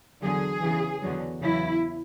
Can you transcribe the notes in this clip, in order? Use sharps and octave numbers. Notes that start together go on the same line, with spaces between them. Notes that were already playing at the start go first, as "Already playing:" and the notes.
E2 D3 F#3 G#4
E2 C#3 E3
E2 D3 F#3
E2 C#3 F#3 E4